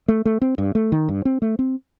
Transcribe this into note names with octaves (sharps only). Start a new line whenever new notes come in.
A3
A3
C4
G2
A3
D#3
G2
C4
A3
C4